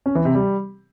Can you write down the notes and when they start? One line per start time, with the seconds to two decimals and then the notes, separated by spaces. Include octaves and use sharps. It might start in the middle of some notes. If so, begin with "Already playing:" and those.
0.06 C#4
0.15 E3
0.25 C3
0.35 G3